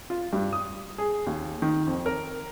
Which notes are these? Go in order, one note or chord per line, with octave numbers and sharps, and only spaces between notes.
F4
G2
D#6
G#4
D#2
D#3
F2
A#4